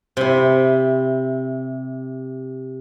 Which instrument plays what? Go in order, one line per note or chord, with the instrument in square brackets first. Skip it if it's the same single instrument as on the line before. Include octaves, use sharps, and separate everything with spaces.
[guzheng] C3 E4